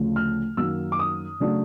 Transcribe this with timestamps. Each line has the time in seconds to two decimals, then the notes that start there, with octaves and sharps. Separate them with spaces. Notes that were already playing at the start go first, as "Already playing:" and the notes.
Already playing: D2 C#3 F3 A3
0.16 F6
0.57 F#2 D#3 F#3 A#3 E6
0.92 D6
0.99 D#6
1.40 C#3 F#3 A3 D4